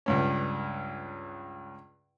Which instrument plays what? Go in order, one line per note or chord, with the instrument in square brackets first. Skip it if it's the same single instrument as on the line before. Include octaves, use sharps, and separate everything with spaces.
[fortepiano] C#2 G2 C#4